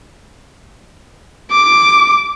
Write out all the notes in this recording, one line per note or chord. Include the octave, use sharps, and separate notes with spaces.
D6